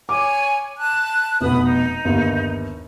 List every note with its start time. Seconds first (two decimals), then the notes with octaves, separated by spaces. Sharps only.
0.09 C#5 G#5 D6
0.78 A5 F#6
1.41 F1 B2 B4 B5 D#6
1.64 D#4
2.05 G1 D#2